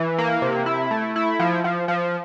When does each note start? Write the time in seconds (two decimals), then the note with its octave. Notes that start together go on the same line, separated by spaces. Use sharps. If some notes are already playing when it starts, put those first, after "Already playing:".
Already playing: E3
0.18 A#3
0.42 C3
0.66 E4
0.91 A3
1.16 E4
1.39 F3
1.64 F3
1.88 F3